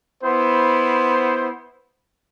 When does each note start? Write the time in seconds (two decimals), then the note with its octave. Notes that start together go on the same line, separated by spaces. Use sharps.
0.23 B3 E4 C5